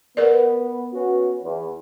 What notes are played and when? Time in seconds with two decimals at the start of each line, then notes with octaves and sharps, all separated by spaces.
0.17 B3 A#4 D5
0.94 B3 C#4 F#4
1.43 E2